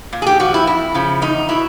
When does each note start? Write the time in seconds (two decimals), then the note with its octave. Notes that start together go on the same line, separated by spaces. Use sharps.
0.13 A#2
0.22 G#4
0.26 G4
0.40 F3 F#4
0.54 E4
0.67 F2 E4
0.94 C#3 F3
1.22 E2 D#4
1.49 B2 E4